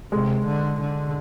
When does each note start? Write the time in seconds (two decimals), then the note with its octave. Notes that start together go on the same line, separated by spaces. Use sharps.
0.12 C3 G#3
0.46 D3
0.80 D3